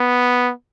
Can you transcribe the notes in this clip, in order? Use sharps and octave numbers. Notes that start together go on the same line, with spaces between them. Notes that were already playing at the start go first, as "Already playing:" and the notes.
Already playing: B3